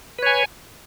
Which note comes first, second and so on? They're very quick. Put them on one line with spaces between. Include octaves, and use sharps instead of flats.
B4 C#5 G#5